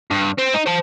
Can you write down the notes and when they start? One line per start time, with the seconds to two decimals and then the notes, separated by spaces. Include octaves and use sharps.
0.11 G2
0.39 C4
0.55 D#4
0.67 C5 A5